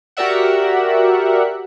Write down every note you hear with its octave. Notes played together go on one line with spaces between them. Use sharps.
F#4 G4 A#4 D5 E5 F#5